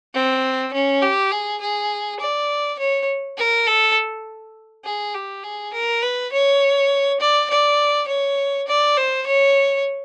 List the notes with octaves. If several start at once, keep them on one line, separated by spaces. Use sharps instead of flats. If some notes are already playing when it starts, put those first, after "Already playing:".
C4
C#4
G4
G#4
G#4
D5
C#5
A#4
A4
G#4
G4
G#4
A#4
B4
C#5
D5
D5
C#5
D5
C5
C#5